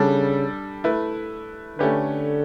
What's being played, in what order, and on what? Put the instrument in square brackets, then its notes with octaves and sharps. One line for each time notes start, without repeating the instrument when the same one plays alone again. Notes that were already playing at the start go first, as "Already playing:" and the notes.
Already playing: [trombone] C#3 [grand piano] G3 D4 A4
[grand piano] A3 E4 B4
[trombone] D3 [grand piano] A3 C#4 G4 B4